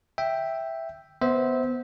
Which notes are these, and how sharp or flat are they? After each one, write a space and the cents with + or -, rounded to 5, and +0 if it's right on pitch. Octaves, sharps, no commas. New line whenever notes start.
E5 +0 G5 +0
B3 +0 C5 -5 E5 -25